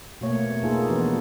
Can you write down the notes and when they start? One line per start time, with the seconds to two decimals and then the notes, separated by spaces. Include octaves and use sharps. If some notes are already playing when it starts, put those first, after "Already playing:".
0.21 B2 A3 A#3 C#5
0.41 B3
0.63 A#3 D#4 F4 G#4 A4
0.89 E3 F3 B3 D4 F4 F#4